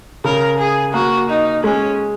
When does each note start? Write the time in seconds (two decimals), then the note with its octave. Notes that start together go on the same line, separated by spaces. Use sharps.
0.24 C#3 A#4
0.59 G#4
0.94 A#3 F#4
1.30 D#4
1.64 G#3 C#4